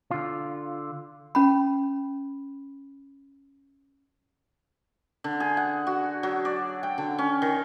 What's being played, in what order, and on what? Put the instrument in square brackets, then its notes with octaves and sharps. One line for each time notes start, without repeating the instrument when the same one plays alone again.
[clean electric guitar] D3 F4
[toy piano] C#4 B5
[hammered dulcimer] D3
G#4
F#5
F#4
F#3
D5
G5
D3
C#4
D#3